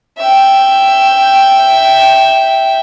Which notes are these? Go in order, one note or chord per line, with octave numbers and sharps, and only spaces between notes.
E5 G5